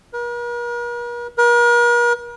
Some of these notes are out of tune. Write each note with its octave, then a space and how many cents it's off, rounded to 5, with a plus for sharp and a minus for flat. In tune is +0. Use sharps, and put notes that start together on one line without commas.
A#4 +45
A#4 +45